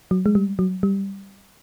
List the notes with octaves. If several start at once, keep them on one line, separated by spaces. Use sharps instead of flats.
F#3
G#3
G3
F#3
G3